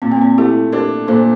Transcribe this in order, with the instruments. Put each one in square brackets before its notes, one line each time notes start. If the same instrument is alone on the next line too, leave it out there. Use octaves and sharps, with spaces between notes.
[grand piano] A#2 [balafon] C4
[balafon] A#3
C4
[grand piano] A3 [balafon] E4 G4
[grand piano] D4 [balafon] G4 A#4
[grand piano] A#2 [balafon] A4 C5